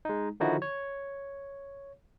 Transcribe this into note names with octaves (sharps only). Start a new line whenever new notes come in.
G#3 D#4
D3 D#3 F3 D#4 E4 F#4
C#5